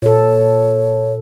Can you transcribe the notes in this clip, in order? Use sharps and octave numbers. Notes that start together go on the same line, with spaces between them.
A#2 A4 C#5